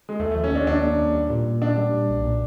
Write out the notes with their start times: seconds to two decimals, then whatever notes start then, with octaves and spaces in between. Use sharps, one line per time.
0.09 G#3
0.20 D#2 A3
0.31 A3
0.35 F3
0.44 C#4
0.51 D#2 D4
0.67 D#2 D4
0.83 A#3
0.98 D#2
1.15 G3
1.30 A#2
1.46 A#2
1.61 A#2 D4
1.77 G3
1.94 A#2
2.09 B1
2.25 A#2